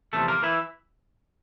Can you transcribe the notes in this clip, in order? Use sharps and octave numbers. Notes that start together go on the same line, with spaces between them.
E2 C3 F3 A3 A4
A#3 A#4
E3 E4